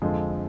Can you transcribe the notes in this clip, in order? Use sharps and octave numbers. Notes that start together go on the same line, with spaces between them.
F2 D3 F3 G#3